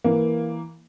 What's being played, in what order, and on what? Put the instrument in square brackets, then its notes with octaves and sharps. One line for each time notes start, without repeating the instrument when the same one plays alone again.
[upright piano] E3 A#3